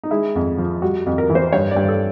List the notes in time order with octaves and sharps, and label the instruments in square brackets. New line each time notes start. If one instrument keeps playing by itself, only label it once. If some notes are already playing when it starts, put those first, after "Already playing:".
[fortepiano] D#4
G#3 E4
F2
F3
G3 F#4
F2
A#4
E3
C5
G2 C#5
D5
G2
A4